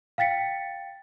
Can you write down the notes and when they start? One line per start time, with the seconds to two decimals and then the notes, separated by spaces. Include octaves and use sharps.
0.18 F5 G5 A6 B6 C#7